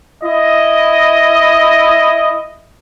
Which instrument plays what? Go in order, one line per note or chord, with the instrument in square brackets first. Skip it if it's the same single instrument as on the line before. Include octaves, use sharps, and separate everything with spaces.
[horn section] E4 D#5